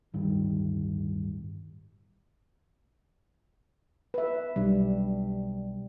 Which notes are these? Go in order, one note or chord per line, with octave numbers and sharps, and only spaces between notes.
D1 G1 D#3 G3
B4 E5
B1 G3 D4